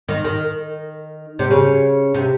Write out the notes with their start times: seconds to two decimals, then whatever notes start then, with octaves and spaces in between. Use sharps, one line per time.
0.09 D#3
0.25 D#3
1.39 C3
1.51 C#3
2.14 C3